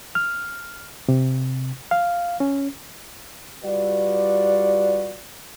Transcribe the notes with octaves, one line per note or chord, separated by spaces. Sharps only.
F6
C3
F5
C#4
G3 F4 F#4 B4 D5